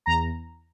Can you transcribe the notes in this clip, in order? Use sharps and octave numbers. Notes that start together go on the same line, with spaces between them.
E2 A#5